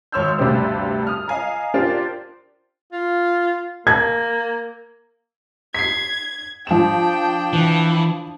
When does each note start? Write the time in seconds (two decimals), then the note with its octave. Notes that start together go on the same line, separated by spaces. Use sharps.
0.12 G#1 C#5 C6 E6 F6 G6
0.38 D2 G2 C3 D4 G4 C5
1.07 D#6 F6
1.28 D#5 F5 G#5 A#5
1.74 D4 F4 G4 A#4 C5
2.93 F4
3.87 A#3 G#6
5.74 G#6 B6 C7
6.67 F3 D4 G5 E7
7.53 E3